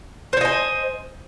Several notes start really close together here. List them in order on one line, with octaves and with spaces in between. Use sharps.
C5 C#5 D#5 G#5